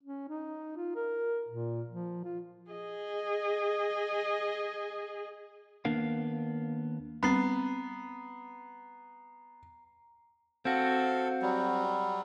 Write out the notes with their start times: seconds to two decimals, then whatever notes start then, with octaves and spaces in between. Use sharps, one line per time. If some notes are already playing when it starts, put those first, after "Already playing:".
0.04 C#4
0.29 D#4
0.77 F4
0.96 A#4
1.49 A#2
1.89 F3
2.25 F4
2.71 G#4 D#5
5.85 D#2 A#3 B3 D4 A#4 F5
7.23 G3 B3 C4 A#5 C7
10.65 C4 F#4 A4 F5
11.42 F#3 G3